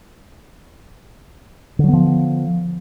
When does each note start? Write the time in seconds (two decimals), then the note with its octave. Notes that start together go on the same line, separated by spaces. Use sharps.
1.79 D3
1.84 F#3
1.89 B3
1.93 F3